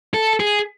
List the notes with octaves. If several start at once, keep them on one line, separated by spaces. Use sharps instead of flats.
A4
G#4